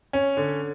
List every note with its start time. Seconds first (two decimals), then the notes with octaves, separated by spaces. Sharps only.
0.13 C#4
0.37 D3